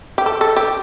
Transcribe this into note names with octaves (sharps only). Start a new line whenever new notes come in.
G4
A4
A4
G4